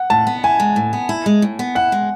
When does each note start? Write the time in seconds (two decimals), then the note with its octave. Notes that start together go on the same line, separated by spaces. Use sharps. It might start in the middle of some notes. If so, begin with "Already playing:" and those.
Already playing: F#5
0.10 A2 A5
0.27 B3
0.44 E4 G#5
0.60 G#3
0.76 A2
0.93 B3
1.09 E4
1.26 G#3
1.42 A2
1.59 B3
1.75 E4 F#5
1.92 G#3